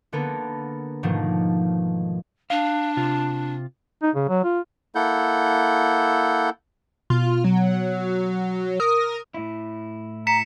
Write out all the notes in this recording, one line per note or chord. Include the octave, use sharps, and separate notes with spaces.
D3 A#3 B3 A4 A#4
G#2 B2 D#3 F3 A3 A#3
D4 F5
C3 F4
D#4
C#3
F#3
F4
A#3 E4 A4 F#5 G6
B2 F4
F#3
A#4 D#6
A2 E4
A#5 B6 C#7 E7